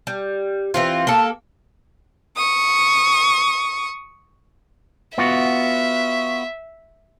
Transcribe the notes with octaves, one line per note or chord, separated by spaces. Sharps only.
G3
E3 C4 F4
A#3 A4
C#6 D#6
B3 F4 F#4 E5